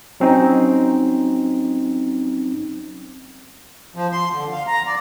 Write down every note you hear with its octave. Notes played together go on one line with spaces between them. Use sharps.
F#3 C4 C#4 D#4
F3
C6
D3
F5
A#5
D5